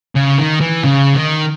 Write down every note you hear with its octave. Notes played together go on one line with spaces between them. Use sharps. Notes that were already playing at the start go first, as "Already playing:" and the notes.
C#3
D#3
E3
C#3
D#3